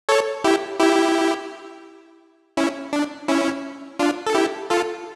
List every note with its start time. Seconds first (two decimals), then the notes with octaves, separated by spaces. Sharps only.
0.09 A4 C#5
0.44 E4 G4
0.80 E4 G4
2.57 C#4 E4
2.93 D4
3.28 C#4 E4
3.99 D4 F4
4.27 A4
4.34 E4 G4
4.70 F4 A4